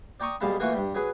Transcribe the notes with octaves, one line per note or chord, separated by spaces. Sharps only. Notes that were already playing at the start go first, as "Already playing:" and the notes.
D5 G5 A#5 C#6 D#6
B1 G3 G#3 F5 A5 B5
E3 A3 A#3 F4 F#4
G2 G3
F#3 G#4 B4